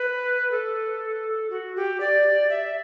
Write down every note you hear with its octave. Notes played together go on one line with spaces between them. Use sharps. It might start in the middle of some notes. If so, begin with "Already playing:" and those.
Already playing: B4
A4
F#4
G4
D5
E5